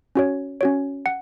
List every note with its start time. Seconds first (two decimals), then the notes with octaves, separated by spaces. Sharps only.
0.15 C#4 F#4 C#5
0.61 C#4 F#4 C#5
1.06 F#5